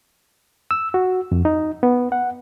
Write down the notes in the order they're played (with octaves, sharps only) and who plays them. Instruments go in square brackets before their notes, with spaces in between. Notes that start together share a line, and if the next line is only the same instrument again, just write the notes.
[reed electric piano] E6
F#4
F2
D#4
B3
F#5